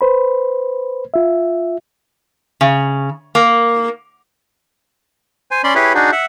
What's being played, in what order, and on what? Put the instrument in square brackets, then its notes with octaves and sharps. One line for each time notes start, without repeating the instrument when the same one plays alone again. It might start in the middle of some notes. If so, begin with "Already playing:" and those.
[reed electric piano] B4 C5 B5
F4 E5
[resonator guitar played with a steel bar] C#3
A#3
[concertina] C5 G#5
C#4 D5 B5 C6
E4 G4 G#4 B4 C#5
D4 D#4 F#4 G#4
E5 F#5